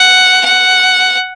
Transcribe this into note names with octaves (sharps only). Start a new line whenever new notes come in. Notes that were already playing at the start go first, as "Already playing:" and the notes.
Already playing: F#5
F#5